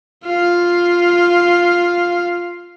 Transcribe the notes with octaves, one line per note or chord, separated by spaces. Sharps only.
F4 F5